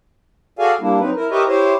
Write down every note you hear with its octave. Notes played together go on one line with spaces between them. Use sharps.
F#4 G#4 A4 D5 F5 G#5
G3 A#3 D4 E4
F#3 C4 D#4 B4
E4 A#4
G4 A#4 B4 C#5 D#5 E5
E4 G4 C5 C#5